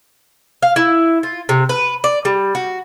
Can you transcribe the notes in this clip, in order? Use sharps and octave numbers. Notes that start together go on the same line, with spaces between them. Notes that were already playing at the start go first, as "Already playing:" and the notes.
F5
E4
F4
C3
B4
D5
G3
F#4